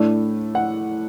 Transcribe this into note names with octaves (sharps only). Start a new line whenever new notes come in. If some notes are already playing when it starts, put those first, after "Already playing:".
Already playing: A2 A3 D4
F#5